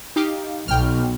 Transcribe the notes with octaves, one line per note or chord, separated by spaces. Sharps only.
D#4 G4 F5
B1 G5 F6